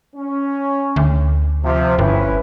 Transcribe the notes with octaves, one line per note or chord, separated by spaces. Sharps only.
C#4
D2
C3 F3
G1 C#4 E4 B4